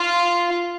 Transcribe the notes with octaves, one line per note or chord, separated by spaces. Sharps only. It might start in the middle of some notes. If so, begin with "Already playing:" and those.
Already playing: F4